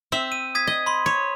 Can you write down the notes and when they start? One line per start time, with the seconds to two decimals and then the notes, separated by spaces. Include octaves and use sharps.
0.12 C4 E5
0.32 D#7
0.55 D#6 G#6 B6
0.67 D#5
0.86 B5 C6
1.06 C#5